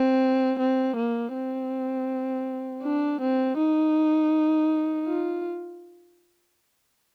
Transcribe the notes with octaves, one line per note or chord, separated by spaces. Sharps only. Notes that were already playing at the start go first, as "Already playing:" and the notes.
Already playing: C4
C4
A#3
C4
D4
C4
D#4
F4